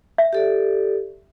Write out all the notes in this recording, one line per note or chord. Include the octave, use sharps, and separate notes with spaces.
E5
G4 A4 D5